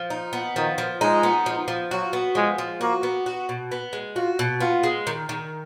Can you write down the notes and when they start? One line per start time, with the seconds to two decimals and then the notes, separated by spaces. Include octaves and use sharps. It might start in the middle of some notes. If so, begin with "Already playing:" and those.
Already playing: F3
0.10 D#4
0.33 B3
0.56 D#3 F3
0.78 F3
1.01 G#3 D#4
1.23 B3
1.46 F3
1.68 F3
1.91 F#3 F#4
2.13 B3
2.35 F3 G#3
2.58 F3
2.81 A#3 F#4
3.03 B3
3.26 F#4
3.49 B2
3.72 B3
3.93 G#3
4.16 F4 F#4
4.39 B2
4.60 B3 F4
4.83 G#3
5.07 D#3
5.29 D#3